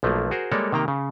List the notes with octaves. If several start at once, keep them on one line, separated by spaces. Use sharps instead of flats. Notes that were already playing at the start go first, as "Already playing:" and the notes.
B1 F3 A3 A#3
F#4 G#4 A#4 C5
G3 G#3 A#3 A4 C#5 D5
C3 D#3 A#3 G5 A#5
C#3